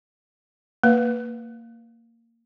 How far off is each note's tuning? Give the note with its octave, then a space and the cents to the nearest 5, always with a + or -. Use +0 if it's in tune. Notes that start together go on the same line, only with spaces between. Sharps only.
A#3 -20 B4 -10 F5 +0